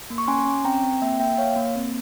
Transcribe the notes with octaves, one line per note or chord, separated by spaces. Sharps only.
A#3
C#6
C#4 G#5 C6
C#4
C4 G5 A#5
C4
A#3 E5 G5
A#3 E5 G5
A#3 C#5 F5
A#3
C4